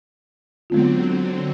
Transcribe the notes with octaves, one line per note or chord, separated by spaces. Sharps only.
D3 F#3 G#3 B3 C4 F4